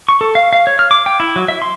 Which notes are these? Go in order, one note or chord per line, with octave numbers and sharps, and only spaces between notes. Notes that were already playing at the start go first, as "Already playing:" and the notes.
C#6
A4
F5
F5
C#5
F6
D6
G5
E4
F#3
E5
C6